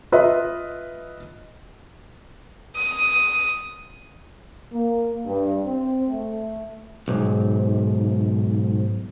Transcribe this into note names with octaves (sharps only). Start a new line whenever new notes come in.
F4 B4 D#5 E5
D#6
A#3
G2
C4
A3
B1 G#2